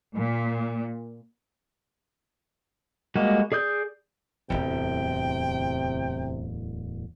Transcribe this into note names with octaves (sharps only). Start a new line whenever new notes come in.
A#2
G3 G#3 A#3 F#4
G#4 D5 D#6 G6
D1 G#1 E2 C3 G5